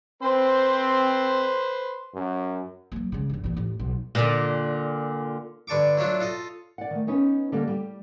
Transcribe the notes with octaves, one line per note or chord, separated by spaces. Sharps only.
C4 B4 C5 C6
F#2
F#3 A#3
C#3 G#3
G1 C#2
E2 A#2
A1
B1
A#2 D3
G2 D3 A5 C#6 D6
F#3 A3 D4 F4 E5
F4 A4 D#5
D5 F#5
D#3 A3
B3 C#4 D#4 B4
D3 G3 A#3 A4
G3 G4